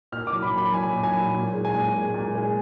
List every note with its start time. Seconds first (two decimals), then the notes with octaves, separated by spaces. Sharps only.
0.12 A#2 F6
0.27 D6
0.32 F#3
0.42 B5
0.53 A#2 B5
0.73 F#3 G#5
0.93 A#2
1.03 G#5
1.13 F#3
1.34 A#2
1.54 G#3
1.65 G#5
1.74 A#2
1.94 G#3
2.14 A#2
2.35 G#3